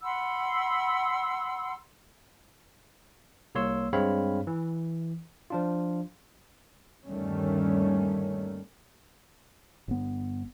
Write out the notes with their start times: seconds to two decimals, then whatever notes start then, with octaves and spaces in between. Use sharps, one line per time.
0.02 F#5 B5 C6 E6
3.55 C2 A#3 C#5 C6 E6
3.93 G2 G#3 C4 C#5 F5 B5
4.47 E3
5.50 F3 D4 F4
7.07 G1 D#2 D#3 G3 A3 C#4
9.88 G1 B3